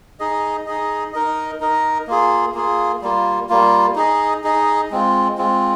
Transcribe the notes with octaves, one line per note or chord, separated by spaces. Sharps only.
D#4 G#4 D#5
D#4 G#4 D#5
D#4 A#4 D#5
D#4 A#4 D#5
A#3 F4 G#4
A#3 F4 G#4
G3 A#3 F4
G3 A#3 F4
D#4 G#4 D#5
D#4 G#4 D#5
G#3 C4 F4
G#3 C4 F4